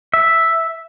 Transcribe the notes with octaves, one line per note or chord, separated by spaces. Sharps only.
E5